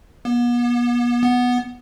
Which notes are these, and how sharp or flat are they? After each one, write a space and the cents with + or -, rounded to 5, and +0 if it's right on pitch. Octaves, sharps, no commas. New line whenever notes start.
B3 -40
B3 -5